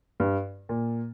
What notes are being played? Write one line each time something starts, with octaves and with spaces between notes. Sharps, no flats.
G2
A#2